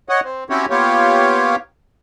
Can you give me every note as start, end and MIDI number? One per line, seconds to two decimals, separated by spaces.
0.09 0.20 73
0.09 0.20 75
0.09 0.20 78
0.24 0.44 60
0.50 0.66 60
0.50 0.66 61
0.50 0.66 64
0.50 0.66 66
0.50 0.66 67
0.50 0.66 73
0.70 1.56 58
0.70 1.56 59
0.70 1.56 65
0.70 1.56 67
0.70 1.56 73